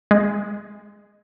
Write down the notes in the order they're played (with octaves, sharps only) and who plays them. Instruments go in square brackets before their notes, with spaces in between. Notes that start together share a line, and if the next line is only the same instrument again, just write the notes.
[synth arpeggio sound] G#3